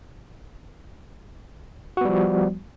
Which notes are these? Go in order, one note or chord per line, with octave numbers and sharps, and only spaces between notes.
F3 G3 B3 F#4